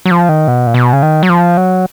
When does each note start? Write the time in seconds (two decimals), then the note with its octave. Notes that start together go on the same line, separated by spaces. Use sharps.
0.06 F#3
0.11 F3
0.29 D#3
0.48 B2
0.67 A#2
0.74 B2
0.93 C#3
1.02 D#3
1.23 F#3
1.30 F3
1.57 F#3